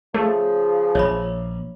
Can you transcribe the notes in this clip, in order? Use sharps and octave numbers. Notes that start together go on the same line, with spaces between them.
C#3 F3 A3
A#1 C#5 E5 B5